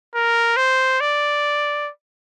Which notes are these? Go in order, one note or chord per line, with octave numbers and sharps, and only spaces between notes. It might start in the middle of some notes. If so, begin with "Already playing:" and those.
A#4
C5
D5